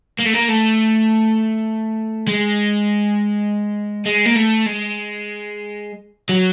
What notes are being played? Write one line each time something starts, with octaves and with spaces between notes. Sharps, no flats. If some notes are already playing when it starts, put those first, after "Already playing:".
A#3
A3
A#3
A3
G#3
G#3
A#3
A3
G#3
F#3